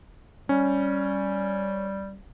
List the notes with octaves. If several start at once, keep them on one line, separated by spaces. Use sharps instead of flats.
G3 C#4